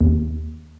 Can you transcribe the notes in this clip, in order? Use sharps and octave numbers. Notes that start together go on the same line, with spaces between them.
D#2